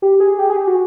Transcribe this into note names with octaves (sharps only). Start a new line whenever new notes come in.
G4
G#4
G4
G#4
G4
F#4